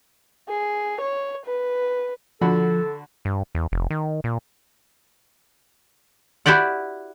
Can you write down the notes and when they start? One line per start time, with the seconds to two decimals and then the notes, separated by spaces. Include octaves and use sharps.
0.49 G#4
1.01 C#5
1.46 B4
2.41 D3 F3 F#4 A4 B5
3.25 G2
3.55 E2
3.72 F1
3.90 D#3
4.24 A#2
6.46 E4 F#4 G4 D5 F#5